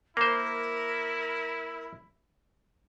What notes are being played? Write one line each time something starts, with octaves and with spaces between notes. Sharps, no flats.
A#3 E4 A#4 C5